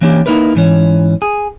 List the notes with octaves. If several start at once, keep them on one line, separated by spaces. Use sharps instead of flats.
E3 A#3 C#4 D4 G4
A#3 D#4 E4 A#4 B4
G#2 E3 C#4
G#4